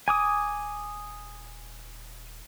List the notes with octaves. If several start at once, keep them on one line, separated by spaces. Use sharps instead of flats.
D#1 G#5 D6 D#6